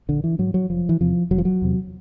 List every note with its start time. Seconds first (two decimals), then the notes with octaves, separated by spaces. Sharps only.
0.08 A#1 D3
0.24 E3
0.39 G#2 F#3
0.54 F#3
0.70 F1 F3
0.89 E3
1.00 E2 C3 F3
1.31 F1 F#3
1.38 F3
1.45 F#3
1.62 E2 C3